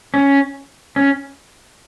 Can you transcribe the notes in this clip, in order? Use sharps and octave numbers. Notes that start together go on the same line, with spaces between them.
C#4
C#4